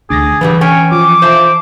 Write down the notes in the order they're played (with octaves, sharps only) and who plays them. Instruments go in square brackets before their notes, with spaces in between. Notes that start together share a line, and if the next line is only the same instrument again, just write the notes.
[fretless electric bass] D2 D4 [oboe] G#4 [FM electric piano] D6 A6 A#6
[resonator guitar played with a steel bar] G2 D3 G3 [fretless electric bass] E3 [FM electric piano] B4
[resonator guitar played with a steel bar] C#4 G5 G#5 [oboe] C#5
[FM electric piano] F3 [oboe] D6
[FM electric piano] F4 E5 C6 [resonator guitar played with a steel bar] C5 A5